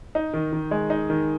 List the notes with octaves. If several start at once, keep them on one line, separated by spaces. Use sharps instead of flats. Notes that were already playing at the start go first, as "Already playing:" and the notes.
D#4
D#3
D#3
G#3
D#4
D#3